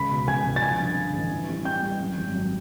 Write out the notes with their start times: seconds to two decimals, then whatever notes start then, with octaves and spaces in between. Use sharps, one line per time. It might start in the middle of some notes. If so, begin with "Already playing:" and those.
Already playing: C#2 B5 B6
0.11 B2
0.27 C#2 G#5 G#6
0.45 C#2
0.56 A6
0.62 F3 G#5 G#6
0.80 G2
0.97 D3
1.14 A1
1.31 E3
1.49 G3
1.65 G3 G5 G6
1.83 G3
2.00 F#2
2.17 G#1
2.34 F#3